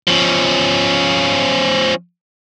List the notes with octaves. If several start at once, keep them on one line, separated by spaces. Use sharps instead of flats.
F3 C#4